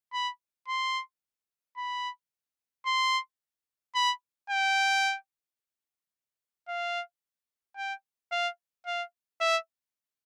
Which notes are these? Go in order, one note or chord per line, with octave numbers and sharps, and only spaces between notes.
B5
C6
B5
C6
B5
G5
F5
G5
F5
F5
E5